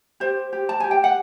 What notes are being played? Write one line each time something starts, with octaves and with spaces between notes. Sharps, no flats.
G4 C5
G4
A5
G4 G#5
G5
F#5